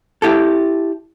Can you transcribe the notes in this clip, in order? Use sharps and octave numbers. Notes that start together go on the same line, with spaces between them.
E4 G4 A4